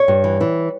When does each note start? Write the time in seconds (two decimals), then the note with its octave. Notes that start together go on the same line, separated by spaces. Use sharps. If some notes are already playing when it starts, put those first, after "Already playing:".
Already playing: C#5
0.08 G2
0.24 E3
0.41 E3